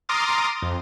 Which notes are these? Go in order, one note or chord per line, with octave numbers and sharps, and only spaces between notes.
A#5 C6 D6 D#6 F6 A6
F2